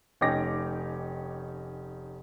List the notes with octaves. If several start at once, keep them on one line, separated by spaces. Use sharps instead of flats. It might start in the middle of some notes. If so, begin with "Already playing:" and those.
F1 C#4 D#4 G5 D6 A#6